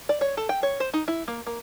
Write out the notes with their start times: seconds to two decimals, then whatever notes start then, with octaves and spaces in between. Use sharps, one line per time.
0.09 D5
0.21 C#5
0.37 A4
0.49 G5
0.63 C#5
0.80 C5
0.93 D#4
1.08 E4
1.28 A#3
1.47 A#3